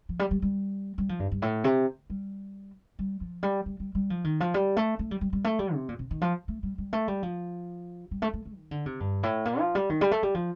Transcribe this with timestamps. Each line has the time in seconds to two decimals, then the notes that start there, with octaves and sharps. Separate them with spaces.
0.09 F3
0.19 G3
0.31 G3
0.42 G3
0.98 G3
1.09 F3
1.20 G2
1.32 G2
1.42 A2
1.64 C3
2.10 G3
2.99 G3
3.21 F3
3.43 G3
3.66 G3
3.80 G3
3.95 G3
4.10 F3
4.24 D#3
4.40 F3
4.54 G3
4.77 A3
4.99 A3
5.11 G3
5.21 G3
5.33 G3
5.44 A3
5.59 G3
5.74 C3
5.89 A#2
5.99 C3
6.11 D#3
6.22 F3
6.48 A3
6.63 G3
6.78 G3
6.93 A3
7.08 G3
7.23 F3
8.11 G3
8.22 A3
8.33 A3
8.45 A3
8.56 D#3
8.71 D3
8.86 C3
9.00 G2
9.23 A2
9.45 A#2
9.59 F3
9.75 G3
9.90 D#3
10.01 G3
10.11 A3
10.23 G3
10.34 F3